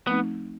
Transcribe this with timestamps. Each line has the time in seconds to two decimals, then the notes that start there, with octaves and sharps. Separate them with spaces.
0.07 F3 A3 B3 C4 D#4